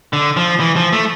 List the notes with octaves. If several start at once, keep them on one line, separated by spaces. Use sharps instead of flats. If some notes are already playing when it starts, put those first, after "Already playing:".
D3
F3
E3
F3
A3